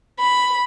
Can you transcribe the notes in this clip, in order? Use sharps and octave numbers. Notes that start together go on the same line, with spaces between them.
B5